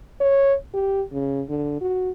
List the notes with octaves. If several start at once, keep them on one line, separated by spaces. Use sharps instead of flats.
C#5
G4
C#3
D3
F#4